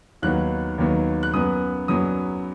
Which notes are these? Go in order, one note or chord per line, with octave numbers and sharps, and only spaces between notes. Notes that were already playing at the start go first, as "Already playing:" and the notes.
D#2 D#3 F#3 B3 F#6
D#2 D#3 F#3 B3
F#6
F#2 F#3 B3 D#6
F#2 F#3 B3 D#6